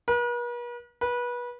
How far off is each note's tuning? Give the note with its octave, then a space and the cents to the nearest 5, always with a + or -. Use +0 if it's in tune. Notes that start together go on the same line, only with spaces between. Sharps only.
B4 -45
B4 -25